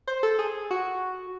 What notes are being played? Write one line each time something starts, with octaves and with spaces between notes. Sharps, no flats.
C5
A4
G#4
F#4